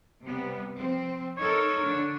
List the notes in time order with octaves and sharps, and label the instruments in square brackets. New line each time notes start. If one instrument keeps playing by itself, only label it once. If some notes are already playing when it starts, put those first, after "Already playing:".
[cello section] C3 G3 B3
F3 C4
[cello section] D#4 A4 A#4 [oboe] C#5
[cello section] D3 D4